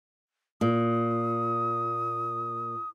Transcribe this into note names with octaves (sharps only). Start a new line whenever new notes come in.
A#2 D#6